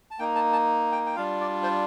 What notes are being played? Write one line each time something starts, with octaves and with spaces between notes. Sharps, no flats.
A5
A#3 D#4 G5
A5
A5
G5
G5
G3 D4 F4 F5
D5
C5